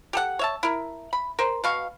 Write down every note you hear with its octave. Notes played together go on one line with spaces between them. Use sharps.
G4 A4 F#5
C#5 E5 A5
E4 A#4
B5
A#4 C5
B2 F5 C#6